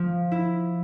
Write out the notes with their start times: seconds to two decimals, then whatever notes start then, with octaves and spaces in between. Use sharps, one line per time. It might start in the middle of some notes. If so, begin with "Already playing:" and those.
Already playing: F3
0.32 E4